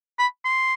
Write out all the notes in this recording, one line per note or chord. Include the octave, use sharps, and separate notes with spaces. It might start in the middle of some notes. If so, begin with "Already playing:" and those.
B5
C6